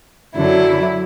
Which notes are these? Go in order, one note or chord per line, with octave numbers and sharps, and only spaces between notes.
F#2 D3 F#3 E4